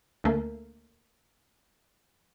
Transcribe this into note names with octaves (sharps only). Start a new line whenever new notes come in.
D2 A3 A#3